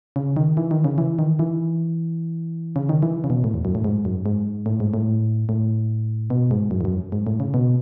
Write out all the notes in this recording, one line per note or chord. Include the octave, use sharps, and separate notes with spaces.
C#3
D#3
E3
D#3
C#3
E3
D#3
E3
C#3
D#3
E3
C#3
B2
A2
E2
F#2
A2
G#2
F#2
G#2
A2
G#2
A2
A2
B2
G#2
F#2
E2
F#2
G#2
A2
C#3
B2